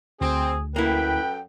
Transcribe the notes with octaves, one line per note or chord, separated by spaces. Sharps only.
D2 C4 G#4
F#2 A#3 E4 A4 B4 G5